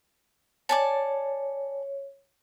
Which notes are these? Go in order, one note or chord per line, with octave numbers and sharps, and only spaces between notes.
C#5 D5 G#5 A5